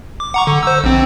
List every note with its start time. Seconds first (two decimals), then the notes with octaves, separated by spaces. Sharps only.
0.20 D6
0.34 F#5 A#5 C#6
0.47 D3
0.63 C5 E6
0.84 A#1 C4